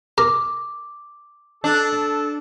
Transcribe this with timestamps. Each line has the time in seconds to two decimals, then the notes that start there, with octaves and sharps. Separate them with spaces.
0.18 A#4 D6
1.64 D4 A4